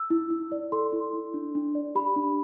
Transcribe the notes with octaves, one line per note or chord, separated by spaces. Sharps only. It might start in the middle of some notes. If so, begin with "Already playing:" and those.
Already playing: E6
E4
E4
D5
A4 C6
E4
E4
D4
D4
D5
G4 B5
D4